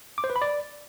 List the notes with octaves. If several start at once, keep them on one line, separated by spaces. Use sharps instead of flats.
D6
C5
B4
B5
D5